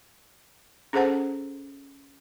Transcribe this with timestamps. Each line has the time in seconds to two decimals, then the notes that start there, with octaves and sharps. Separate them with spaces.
0.93 C#4 G#4 A4 C5 F#5 A5